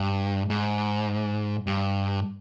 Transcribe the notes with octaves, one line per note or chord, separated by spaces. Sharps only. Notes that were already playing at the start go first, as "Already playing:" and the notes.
Already playing: G2
G#2
G2